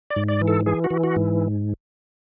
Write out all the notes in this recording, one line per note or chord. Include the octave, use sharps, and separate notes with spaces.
D5
G#2
D5
E3
A4
E3 G#4
F#4
E3
F#4
G#2